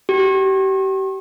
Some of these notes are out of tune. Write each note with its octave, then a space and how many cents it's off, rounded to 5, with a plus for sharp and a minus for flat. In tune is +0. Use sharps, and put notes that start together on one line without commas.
G4 -35